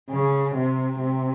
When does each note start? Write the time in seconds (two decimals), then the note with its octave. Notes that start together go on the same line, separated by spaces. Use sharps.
0.10 C#3
0.55 C3
0.99 C3